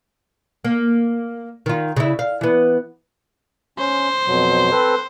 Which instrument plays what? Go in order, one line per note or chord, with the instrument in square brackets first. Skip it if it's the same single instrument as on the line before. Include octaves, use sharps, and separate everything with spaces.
[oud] A#3
D#3 F4
C#3 E4
F5
E3 B3
[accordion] C#4 [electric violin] C5
[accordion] F2 B2 F#3
C4 A4 B4